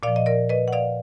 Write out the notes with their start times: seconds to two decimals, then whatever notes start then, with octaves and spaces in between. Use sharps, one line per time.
0.03 A#2 D5 F5
0.07 F3
0.16 D#5
0.26 A#4 D5
0.49 B4 D#5
0.68 F#5
0.73 D5 F5